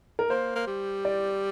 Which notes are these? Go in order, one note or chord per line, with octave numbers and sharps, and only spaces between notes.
A#4
A#3 C5
A#3
G3
D5